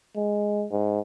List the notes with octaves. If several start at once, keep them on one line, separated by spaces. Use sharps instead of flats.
G#3
G#2